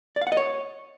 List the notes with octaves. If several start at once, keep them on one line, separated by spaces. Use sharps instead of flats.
D5
F5
F#5
D#5
C#5